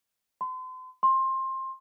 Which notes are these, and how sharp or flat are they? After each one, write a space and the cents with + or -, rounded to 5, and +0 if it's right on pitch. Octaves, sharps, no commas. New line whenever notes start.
C6 -40
C6 +20